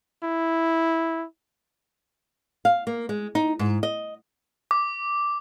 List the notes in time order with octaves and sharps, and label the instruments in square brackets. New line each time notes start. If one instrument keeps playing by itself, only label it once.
[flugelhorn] E4
[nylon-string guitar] F5
A#3
G#3
D#4
G#2
D#5
[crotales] D6